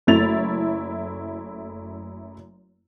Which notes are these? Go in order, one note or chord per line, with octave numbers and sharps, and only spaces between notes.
F#1 F#2 A3 E4 A6 F7